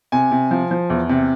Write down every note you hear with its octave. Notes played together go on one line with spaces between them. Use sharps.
C3 G#5
C3
F3
F3
E2
C3